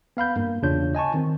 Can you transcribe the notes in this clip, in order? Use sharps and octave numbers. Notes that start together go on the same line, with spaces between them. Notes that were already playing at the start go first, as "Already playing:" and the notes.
B3 F5 B5 G6
G2 A#3
E2 C#3 D4 F4 C#5 G6
D#5 G#5 A5 C#6
D#3 C4